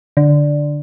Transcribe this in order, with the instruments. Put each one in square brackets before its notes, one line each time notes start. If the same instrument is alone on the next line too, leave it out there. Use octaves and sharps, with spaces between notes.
[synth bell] D3